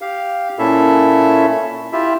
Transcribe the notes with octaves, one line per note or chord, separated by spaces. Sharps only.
G4 F5
A#2 C#4 E4 A4 E5
E4 F4 G4 E5